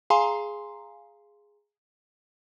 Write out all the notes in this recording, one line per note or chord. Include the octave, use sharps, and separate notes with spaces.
G#4 F5 G#5 A#5 C6